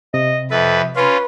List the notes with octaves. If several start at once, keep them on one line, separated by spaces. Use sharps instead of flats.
C3 D#5
F2 A4 B4 E5
C#4 F4 B4 C6